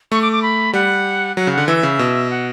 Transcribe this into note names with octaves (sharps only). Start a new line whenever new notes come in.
A3 C#6
D6
D6
B5
G3 F#5
F#3 F#5
C#3
F#5
D3
E3 E5
C#3
B2
F#5